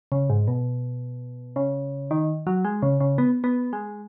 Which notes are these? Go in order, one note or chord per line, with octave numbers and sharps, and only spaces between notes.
C#3
G#2
B2
C#3
D#3
F#3
G#3
C#3
C#3
B3
B3
G#3